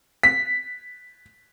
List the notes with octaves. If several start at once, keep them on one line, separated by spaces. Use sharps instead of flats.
B6